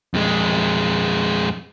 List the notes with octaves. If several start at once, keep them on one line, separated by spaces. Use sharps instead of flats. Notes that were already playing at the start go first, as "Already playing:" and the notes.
F2 G#3